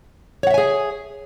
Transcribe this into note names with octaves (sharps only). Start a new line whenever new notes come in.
G#4 C#5 E5 F#5 G#5